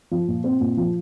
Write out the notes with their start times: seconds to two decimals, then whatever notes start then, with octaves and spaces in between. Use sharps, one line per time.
0.11 F3
0.28 A#2
0.44 C4
0.60 A#2
0.77 F3